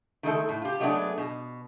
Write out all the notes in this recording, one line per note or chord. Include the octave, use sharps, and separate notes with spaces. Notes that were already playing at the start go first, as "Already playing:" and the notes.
D#3 G#3 A3 A4
A2
F4 G4
F#3 G#3 A3 B3 D4 G#4
B2